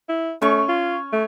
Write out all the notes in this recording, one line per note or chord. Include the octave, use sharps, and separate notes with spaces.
E4
A3 C#4 C#6
F4
A3